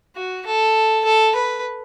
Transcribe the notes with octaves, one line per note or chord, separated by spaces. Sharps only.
F#4
A4
A4
B4